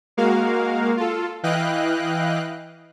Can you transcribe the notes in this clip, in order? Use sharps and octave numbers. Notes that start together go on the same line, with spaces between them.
G#3 A#3 F#4 A#4 F5
F4 A4
E3 E4 D#5 F5 G5 F#6